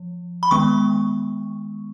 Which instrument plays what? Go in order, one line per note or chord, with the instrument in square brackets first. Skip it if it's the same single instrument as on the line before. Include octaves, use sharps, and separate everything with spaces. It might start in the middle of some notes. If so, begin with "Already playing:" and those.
Already playing: [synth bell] F3
B5
D#3 G#3 B3 C#6